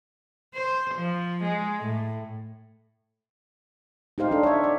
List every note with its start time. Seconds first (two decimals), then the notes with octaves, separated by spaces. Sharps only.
0.54 C5
0.95 F3
1.44 G#3
1.84 A2
4.18 D#4 G4 C5 F5
4.31 D4 A4
4.43 C#5 E5
4.64 D5